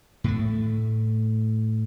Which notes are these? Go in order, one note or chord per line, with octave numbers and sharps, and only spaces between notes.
A2 A3